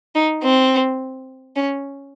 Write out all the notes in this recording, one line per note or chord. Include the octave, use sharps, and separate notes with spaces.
D#4
C4
C#4